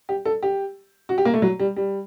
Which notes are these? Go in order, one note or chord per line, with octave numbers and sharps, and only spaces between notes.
G4
A4
G4
F#4
G4
A#3
A3
F#3
G3
G3